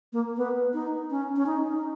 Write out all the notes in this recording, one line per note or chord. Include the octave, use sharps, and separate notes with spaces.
A#3
B3
D#4
C#4
C#4
D#4
D#4